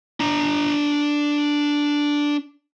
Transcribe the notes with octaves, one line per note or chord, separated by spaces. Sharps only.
D4 A#5